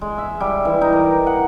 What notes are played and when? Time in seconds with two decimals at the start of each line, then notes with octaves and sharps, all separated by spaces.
0.01 G#3
0.18 E5
0.40 G3
0.65 E3
0.81 D#4
0.93 A#4
1.27 F#5